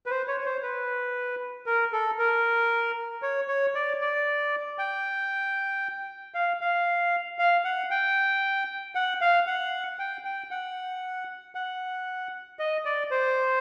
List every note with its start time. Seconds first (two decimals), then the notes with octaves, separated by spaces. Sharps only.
0.06 B4
0.10 C5
0.28 C#5
0.41 C#5
0.45 C5
0.63 B4
1.66 A#4
1.93 A4
2.18 A#4
3.22 C#5
3.48 C#5
3.75 D5
4.01 D5
4.79 G5
6.34 F5
6.61 F5
7.39 F5
7.65 F#5
7.91 G5
8.95 F#5
9.21 F5
9.47 F#5
9.99 G5
10.25 G5
10.51 F#5
11.55 F#5
12.59 D#5
12.85 D5
13.11 C5